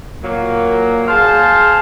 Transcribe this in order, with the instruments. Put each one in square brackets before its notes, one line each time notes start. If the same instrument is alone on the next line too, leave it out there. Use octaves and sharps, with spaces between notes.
[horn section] A#2 F#3 A#3
G#4 C5 F5 A5